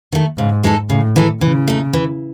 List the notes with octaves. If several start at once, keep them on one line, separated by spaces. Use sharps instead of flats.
D#3 A3
G#2 C#3
E3 G#3 D#4 A4
A2 C#3
E3 G#3 D#4 A4
C#3 E3
A3 D#4
E3